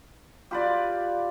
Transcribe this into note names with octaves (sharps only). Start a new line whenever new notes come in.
F4 G4 B4 D5